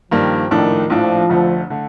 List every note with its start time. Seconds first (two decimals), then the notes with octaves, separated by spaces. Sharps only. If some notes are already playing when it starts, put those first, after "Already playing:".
0.11 G2 D#3 F3 G3 A#3
0.51 A#1 A2 D#3 A3 D4
0.90 A#1 A2 F3 A3 D4
1.29 F1 F2 D3 A3
1.70 D3 A3